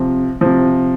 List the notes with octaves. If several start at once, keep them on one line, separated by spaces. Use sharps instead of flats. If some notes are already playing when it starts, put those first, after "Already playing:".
Already playing: C3 F3
C3 F3